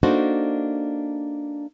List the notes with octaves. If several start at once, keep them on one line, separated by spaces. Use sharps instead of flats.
A#3 D4 D#4 F#4 A4 C5